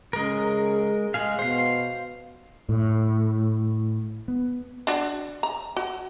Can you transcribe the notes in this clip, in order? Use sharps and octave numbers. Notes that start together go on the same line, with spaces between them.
C#3 G#3 A#4
G#3 G#4 F5
B2 C5 F5
A2
B3
D4 F#4
A#5
F#4